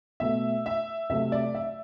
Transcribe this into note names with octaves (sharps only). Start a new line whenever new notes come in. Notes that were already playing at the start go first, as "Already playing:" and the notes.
B2 A3 E5
E5
C3 F#3 A3 E5
D5
E5